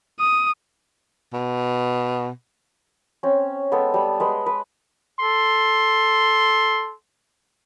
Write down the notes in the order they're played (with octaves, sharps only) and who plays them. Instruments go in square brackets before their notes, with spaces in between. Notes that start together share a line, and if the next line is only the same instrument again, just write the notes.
[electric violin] D#6
[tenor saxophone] B2
[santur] C4 C#4
G#3 B3 C4 A4
G3 B5
G#3 B4 C6
B4
[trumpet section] A4 C6